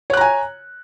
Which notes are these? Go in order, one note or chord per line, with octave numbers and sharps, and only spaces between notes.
C#5 G#5 A#5 F#6